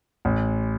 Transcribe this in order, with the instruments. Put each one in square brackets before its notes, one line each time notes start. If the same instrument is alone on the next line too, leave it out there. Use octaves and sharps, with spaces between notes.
[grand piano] A1